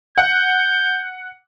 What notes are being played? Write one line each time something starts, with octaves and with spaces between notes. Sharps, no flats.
F#5 G6